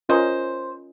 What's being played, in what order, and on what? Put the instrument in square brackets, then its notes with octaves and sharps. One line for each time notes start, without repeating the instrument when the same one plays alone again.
[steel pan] C#4 F4 A#4 D#5 G#5 [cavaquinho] C5